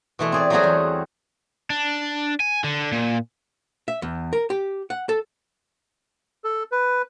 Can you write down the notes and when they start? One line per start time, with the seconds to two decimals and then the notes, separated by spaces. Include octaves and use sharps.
0.19 B2 E3 A3 C6
0.32 C4 G#4 D5
0.50 F#3 G3 A3 C4 F#4 G#4
0.64 E2
1.70 D4
2.40 G#5
2.64 D3
2.92 A#2
3.88 E5
4.02 E2
4.33 A#4
4.50 G4
4.90 F#5
5.09 A4
6.44 A4
6.72 B4